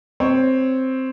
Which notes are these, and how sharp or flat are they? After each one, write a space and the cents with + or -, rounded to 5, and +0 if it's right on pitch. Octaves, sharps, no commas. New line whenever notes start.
C4 +0 C#5 +0